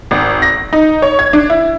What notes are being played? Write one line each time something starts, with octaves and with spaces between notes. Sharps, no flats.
G#1
A#6
D#4
C#5
G#6
D4
E4